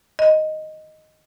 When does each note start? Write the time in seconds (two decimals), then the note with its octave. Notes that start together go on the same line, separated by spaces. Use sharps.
0.19 D#5